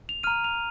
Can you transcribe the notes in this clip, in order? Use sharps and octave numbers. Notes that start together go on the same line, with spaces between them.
F7
A#5 F6 D#7
F7